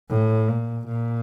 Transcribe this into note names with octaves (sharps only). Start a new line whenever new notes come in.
A2
A#2
A#2